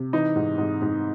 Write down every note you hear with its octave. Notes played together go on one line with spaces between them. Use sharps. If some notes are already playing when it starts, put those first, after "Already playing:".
Already playing: C3
E3 D#4
G#2
G#2
G#2